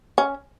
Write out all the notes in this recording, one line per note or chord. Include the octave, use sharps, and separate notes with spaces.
C#4